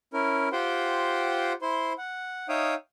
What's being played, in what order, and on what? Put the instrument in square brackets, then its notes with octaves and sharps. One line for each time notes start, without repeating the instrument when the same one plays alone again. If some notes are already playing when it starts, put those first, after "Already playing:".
[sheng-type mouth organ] C#4 E4 A#4
F4 G4 C5 F#5 G5 C6
E4 C5 C6
F#5
D#4 C#5 E5 F5 G5 D#6